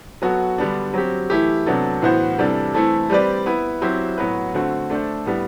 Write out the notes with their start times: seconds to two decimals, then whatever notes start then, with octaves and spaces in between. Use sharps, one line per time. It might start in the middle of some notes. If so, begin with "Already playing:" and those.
0.22 F#3 B3 F#4 A4
0.58 D3 G3 B3 D4
0.94 F#3 C4 G4
1.30 E3 A3 E4 G4
1.66 C3 F#3 B3 D4 A4
2.02 A2 E3 B3 F#4 C5
2.38 C3 E3 G3 D4 A4
2.74 E3 A3 C4 E4 A4
3.10 G3 C4 G4 B4 D5
3.46 B3 E4 B4
3.82 F#3 C4 E4 G4 C5
4.18 A2 F#3 B3 F#4 B4
4.54 D3 A3 C4 F#4
4.90 A3 D4 A4 C5
5.26 A2 G3 B3